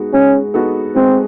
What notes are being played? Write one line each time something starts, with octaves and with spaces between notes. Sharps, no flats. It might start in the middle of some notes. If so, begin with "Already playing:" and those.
Already playing: G#3 B3 D#4 F#4
G#3 C#4
B3 D#4 F#4 A4
G#3 C4